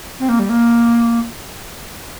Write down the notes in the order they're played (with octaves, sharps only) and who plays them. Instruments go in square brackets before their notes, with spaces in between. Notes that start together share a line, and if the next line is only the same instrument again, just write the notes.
[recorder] C4
A#3
G3
A#3